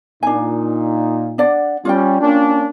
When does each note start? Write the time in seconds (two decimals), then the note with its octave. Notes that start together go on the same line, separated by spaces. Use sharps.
0.23 A#2 D4 D#4 G#5
1.38 D4 D5 F#5
1.85 G3 C#4 F4 D5 G5
2.21 A#3 C#4 D4